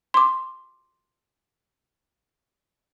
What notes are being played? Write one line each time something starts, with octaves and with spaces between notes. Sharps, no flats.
C6 D6